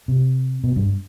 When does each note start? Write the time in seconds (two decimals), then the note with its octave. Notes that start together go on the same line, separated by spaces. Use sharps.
0.08 C3
0.64 B2
0.76 G2